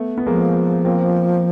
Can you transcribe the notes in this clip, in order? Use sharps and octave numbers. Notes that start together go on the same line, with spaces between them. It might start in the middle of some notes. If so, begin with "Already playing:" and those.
Already playing: A3 B3
B3
F3 G#3 A#3
A#3 C4